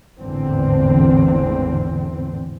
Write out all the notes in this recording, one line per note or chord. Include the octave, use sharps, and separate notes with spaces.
G#1 E2 A2 D3 E3 C4